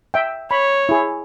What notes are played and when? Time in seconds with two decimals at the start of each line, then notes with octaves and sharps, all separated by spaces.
0.14 E5 G5
0.51 C#5 B5
0.89 E4 G#4